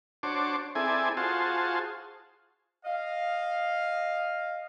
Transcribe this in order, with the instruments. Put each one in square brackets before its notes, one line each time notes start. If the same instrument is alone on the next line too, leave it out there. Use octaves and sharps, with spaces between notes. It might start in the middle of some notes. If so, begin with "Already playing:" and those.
[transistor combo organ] D4 F#4 C5 C#5 A5 D6
C4 E4 G#4 A4 D5 G#5
F4 F#4 G#4 C5 A5
[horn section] D#5 F5